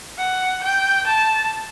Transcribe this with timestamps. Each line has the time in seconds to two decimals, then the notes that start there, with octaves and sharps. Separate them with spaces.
0.19 F#5
0.63 G5
1.07 A5